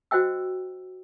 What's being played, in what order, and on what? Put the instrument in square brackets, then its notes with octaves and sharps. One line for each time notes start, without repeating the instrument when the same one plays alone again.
[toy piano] F#4 C5 D#5 G5 E6